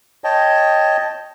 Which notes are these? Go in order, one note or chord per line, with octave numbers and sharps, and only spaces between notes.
C#5 D#5 G5 A5